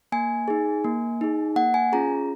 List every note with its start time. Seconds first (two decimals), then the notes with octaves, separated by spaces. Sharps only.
0.12 A#3 G#5
0.48 D#4 G#4
0.84 A#3
1.21 D#4 G#4
1.56 A#3 F#5
1.74 G#5
1.92 C#4 F4 G#4 A#5